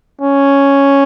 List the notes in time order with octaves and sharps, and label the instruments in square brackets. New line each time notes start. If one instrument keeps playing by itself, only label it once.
[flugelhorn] C#4